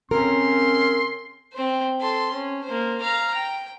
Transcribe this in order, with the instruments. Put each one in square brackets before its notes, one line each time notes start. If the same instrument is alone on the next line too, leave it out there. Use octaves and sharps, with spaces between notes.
[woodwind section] C#3 C4 C#4 [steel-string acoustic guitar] A#4 [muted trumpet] C6
[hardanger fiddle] C4 C5
A4 C6
C#4
A#3 C5
F5 A#5
G5